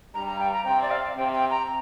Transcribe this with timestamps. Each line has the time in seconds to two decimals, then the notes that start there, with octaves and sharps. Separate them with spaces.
0.14 G2 G3 A#5
0.27 A#5
0.40 G5
0.52 A#5
0.65 C3 C4 G5
0.82 D5
0.91 F5
1.16 C3 C4 G5
1.33 G5
1.50 A#5